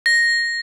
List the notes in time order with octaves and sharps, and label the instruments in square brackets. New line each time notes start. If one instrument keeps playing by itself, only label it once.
[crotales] A#6